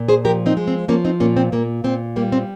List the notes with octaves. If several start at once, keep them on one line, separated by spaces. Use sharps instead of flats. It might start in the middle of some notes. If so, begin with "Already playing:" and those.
Already playing: A#2
G#4 C5
F3 G4 A#4
C4 D#4
G#3
C4
F3 A#3 C#4
C4 D#4
A#2 A#3 C#4
C4
A#2 A#3
A#2 C4
G3 A#3
C4